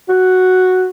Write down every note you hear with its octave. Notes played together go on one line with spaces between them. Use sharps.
F#4